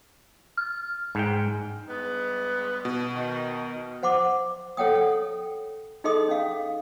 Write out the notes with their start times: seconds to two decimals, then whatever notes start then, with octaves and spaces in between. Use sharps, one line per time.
0.57 F6
1.15 G#2 G5
1.88 G2 G#3 B3
2.85 B2
3.14 D#3
4.03 C5 F#5 C6 D6
4.77 A4 C#5 F#5 G5 D#6
4.95 A4
6.04 D#4 G#4 A4 D#5 C6 D#6
6.28 C#4 F5